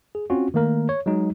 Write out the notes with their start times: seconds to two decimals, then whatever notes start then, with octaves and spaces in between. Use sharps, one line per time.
0.15 G#4
0.30 C4 C#4 F4 F#4
0.54 D#3 A3 A#3 A#4
0.89 C#5
1.06 F#3 G#3 D#4